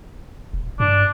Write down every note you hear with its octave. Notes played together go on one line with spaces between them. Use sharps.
D#1
G2 D4